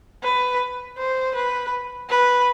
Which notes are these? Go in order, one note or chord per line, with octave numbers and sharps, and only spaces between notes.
B4
C5
B4
B4